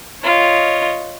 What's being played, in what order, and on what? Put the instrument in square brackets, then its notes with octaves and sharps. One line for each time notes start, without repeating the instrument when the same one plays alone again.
[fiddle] F4 [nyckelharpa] C#5 D#5